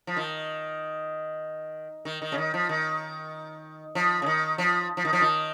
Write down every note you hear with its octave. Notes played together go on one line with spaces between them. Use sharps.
F3
D#3
D#3
D#3
C#3
D#3
F3
D#3
F3
C#3
D#3
F3
F3
D#3
F3
D#3